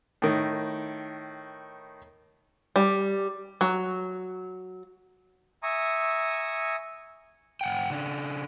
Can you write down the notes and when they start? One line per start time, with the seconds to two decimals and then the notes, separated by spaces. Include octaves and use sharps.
0.22 A2 D#3
2.76 G3
3.61 F#3
5.63 E5 G#5 A#5 C#6 D#6
7.61 G#2 F#5 G5
7.90 C#3 D4